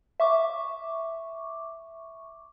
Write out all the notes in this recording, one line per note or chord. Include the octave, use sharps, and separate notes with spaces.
E5 C#6 D6